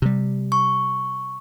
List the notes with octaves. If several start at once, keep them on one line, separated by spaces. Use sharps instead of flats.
C3 G3
C#6